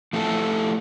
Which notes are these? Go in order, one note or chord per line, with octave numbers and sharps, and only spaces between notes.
F3 A3 E4 A4